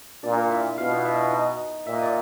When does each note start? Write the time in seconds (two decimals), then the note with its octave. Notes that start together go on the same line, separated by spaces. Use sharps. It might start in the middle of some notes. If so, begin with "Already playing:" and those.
0.23 A#2 D4 D5
0.51 E4 E5
0.78 B2 F4 F5
1.05 E4 E5
1.32 D#4 D#5
1.86 A#2 E5
1.95 D#5
2.03 D5